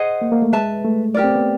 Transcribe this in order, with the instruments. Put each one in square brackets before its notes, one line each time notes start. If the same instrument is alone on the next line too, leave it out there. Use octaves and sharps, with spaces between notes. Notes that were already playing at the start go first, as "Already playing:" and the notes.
Already playing: [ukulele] G#4 C5 D#5 F#5
[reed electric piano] A#3
A#3
A3
[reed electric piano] G#3 [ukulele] B4 E5 A5
[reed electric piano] A3
[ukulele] G4 A#4 D5
[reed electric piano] C4
B3